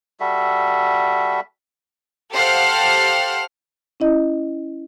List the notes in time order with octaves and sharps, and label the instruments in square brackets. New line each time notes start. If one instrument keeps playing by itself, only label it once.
[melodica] G3 F#4 A4 E5
[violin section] G4 A4 C5 F5 F#5 F6
[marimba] C#4 E4 D#5